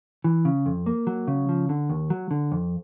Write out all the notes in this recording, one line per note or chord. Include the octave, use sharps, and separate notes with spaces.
E3
C#3
F2
A#3
F#3
C#3
F3
D3
D#2
F#3
D3
F2